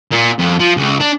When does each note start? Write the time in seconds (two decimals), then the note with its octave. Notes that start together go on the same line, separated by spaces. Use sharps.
0.11 A#2
0.39 F2
0.60 F3
0.77 C#2
1.00 D4